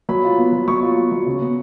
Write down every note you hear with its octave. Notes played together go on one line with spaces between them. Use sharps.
F#3 B5
F4
B3
F#3
F#3 C#6
F4
B3
F#3
C#3
B3